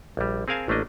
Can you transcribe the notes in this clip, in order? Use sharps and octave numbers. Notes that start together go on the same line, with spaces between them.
A#1 G3
C4 G#4 A#4 F5 G#5 A5
A1 A3 A#3 D4 D#5